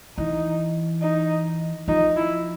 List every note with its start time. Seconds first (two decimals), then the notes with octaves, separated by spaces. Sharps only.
0.18 E3 D#4
1.02 D#4
1.88 F3 D#4
2.17 E4